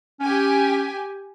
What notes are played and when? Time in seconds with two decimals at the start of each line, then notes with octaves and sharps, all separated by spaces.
0.20 C#4 G4 G#5